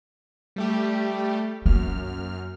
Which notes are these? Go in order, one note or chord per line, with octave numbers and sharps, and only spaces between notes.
G3 A3 G4
F#2 A#3 F6